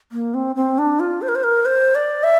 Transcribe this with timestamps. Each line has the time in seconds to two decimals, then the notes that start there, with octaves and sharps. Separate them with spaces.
0.12 A#3
0.34 C4
0.56 C4
0.78 D4
1.00 F4
1.22 C5
1.28 A#4
1.35 C5
1.44 A#4
1.66 C5
1.95 D5
2.24 E5